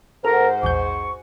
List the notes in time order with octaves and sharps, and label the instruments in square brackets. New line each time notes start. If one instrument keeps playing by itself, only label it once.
[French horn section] G#2 C5 [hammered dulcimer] F#4 F#5 [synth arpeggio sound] A4 [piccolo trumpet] A#4
[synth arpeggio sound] A#1 E2 G6 [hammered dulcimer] G#5 [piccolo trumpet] C#6